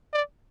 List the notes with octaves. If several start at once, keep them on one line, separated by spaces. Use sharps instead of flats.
D5